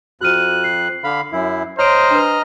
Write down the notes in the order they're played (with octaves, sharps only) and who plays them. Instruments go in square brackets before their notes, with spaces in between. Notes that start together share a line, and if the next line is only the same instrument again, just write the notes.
[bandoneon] F2 F#6 [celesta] F#4 F6 D#7
[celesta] C7
[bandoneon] D3 F5 B5
F#2 E4
[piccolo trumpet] C5 [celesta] C#5 D7 [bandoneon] D#5 A#5 F6
[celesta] D4 B4